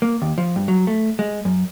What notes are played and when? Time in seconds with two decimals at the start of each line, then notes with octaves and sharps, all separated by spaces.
0.02 A#3
0.22 D#2
0.38 F3
0.56 G2
0.68 F#3
0.87 A3
1.19 G#3
1.45 F#2